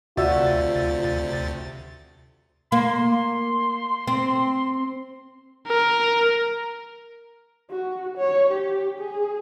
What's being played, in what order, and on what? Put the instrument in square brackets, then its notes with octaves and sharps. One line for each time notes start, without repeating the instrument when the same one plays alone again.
[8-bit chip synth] D2 C3 A6 [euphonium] F4 [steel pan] F#4 E5 [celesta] D5
[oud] A#3 [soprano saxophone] C6
[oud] C4
[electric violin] A#4
[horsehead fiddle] F#4
C#5
G4
G#4